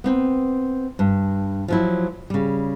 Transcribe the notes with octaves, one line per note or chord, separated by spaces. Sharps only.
B3 C4 G5
G2
F3 F#3 E4
C#3 G3